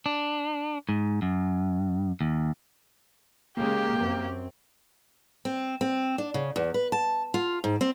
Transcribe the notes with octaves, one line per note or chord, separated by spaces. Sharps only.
D4
G#2
F#2
D#2
C#3 G#3 A#3 G4
F#2 C4
C4
C4
D4
C#3
E2
B4
A5
F4
G#2
C4